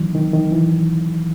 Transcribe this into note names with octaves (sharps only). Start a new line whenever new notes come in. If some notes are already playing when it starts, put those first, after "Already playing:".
Already playing: D#3 E3 F#3
D#3
D#3
E3